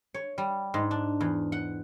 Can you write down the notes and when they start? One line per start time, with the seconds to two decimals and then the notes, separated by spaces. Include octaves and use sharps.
0.14 C#5
0.38 G3
0.74 G#2
0.91 D4
1.21 E2
1.52 F#5